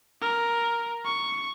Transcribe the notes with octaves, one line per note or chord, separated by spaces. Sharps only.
A#4
C#6